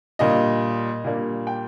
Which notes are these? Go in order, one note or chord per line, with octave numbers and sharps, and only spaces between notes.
A#2 G3 A#3 D4 D#5
A#2 G3 A#3 D4
G5